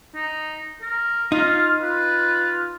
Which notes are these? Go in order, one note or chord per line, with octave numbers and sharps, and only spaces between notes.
D#4
A#4
D#4 F4 F5
F4 B4